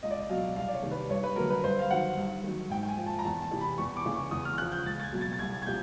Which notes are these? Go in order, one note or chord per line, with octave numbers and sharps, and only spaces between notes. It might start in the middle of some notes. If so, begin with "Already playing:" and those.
C#2 D#5
D5
D#5
B2 F#3 F5
C2 F5
D5
C#5
C3 D#3
B4
G2 C#5
B4
D3 F#3 A#4
B4
G2 C5
F5
D#3 F#3 F#5
G2
D#3 F#3
G#2 G5
G5
G#5
F3
A5
A#5
E2 A5
A5
C3 E3
B5
E2 C#6
D6
C#3 E3
C#6
E2 D#6
F6
C#3 F3 F#6
G6
C#2 A6
A6
G#6
B2 F#3
A6
A6
C2 G#6
G#6
C3 F3 G6